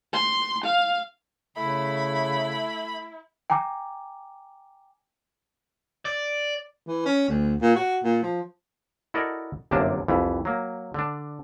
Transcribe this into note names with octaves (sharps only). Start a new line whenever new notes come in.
C6
F5
C#3 A3 E4 B5
G5 G#5 A#5 D6
D5
E3
C#4
D2
A#2
F#4
A#2
F3
E4 F#4 A4 A#4 D5 D#5
G1 F#2 C3 A#3 D4 A5
C2 F2 E3
F#3 A#3
D3 D4